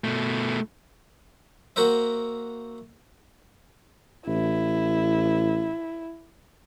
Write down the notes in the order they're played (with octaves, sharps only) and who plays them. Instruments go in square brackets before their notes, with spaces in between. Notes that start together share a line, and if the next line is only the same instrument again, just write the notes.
[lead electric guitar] B2 A3
[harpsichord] A#3 F#4 A#4 C5 E5
[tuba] A1 [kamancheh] E4